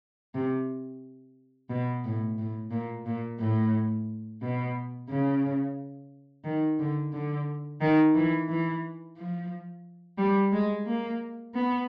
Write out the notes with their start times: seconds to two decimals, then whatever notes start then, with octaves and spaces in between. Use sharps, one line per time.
0.35 C3
1.70 B2
2.04 A2
2.38 A2
2.71 A#2
3.06 A#2
3.40 A2
4.42 B2
5.09 C#3
6.45 D#3
6.79 D3
7.13 D3
7.81 D#3
8.15 E3
8.49 E3
9.17 F3
10.18 G3
10.53 G#3
10.86 A#3
11.54 B3